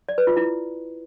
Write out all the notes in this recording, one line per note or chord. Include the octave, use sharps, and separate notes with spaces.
D5
B4
F4
E4